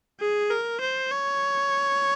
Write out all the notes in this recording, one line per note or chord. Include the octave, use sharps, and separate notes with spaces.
G#4
A#4
C5
C#5